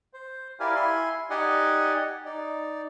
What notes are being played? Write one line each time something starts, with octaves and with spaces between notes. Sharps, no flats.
C5
E4 G4 A#4 D5 F5 G#5
E4 G#5 C6
D#4 G4 D5 D#5 F#5 G#5
D#4 D5